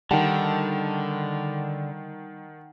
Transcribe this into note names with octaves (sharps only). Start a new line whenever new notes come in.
D3 D#3 G3 F#5 G5 A5